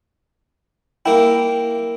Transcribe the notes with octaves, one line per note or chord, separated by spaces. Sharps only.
A#3 E4 G5